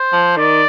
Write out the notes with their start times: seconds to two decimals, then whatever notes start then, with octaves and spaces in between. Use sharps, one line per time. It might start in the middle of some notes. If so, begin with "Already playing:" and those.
Already playing: C5
0.12 F3
0.37 D#3 D5